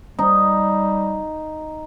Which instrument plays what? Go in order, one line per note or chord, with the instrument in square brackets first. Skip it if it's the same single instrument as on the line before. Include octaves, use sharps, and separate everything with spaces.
[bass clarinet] G3 [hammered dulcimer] D#4